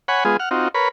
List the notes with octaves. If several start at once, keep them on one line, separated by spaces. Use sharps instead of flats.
C#5 F#5 G#5 B5
G#3 B3 F4 G#4
F#5 F6
C4 D#4 F4 F#4
A#4 B4 C#5 B5